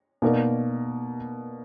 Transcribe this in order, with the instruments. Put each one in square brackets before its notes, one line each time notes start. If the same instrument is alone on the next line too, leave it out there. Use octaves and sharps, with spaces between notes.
[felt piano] B2 A#3 D#4 A#4 D5